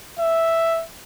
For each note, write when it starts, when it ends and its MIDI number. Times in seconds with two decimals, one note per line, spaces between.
0.19 0.83 76